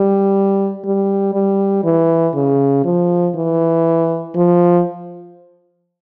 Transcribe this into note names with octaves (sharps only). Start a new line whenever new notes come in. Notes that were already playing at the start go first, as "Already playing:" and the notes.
Already playing: G3
G3
G3
E3
C#3
F3
E3
F3